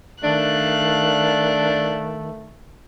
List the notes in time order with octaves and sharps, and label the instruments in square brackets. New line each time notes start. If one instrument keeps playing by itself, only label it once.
[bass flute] D#3 [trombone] A3 [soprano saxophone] D4 [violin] F5 F#6